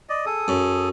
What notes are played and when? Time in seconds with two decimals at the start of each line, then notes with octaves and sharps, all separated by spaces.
0.09 D5 D#5
0.26 G#4 A4 D#6
0.48 F#2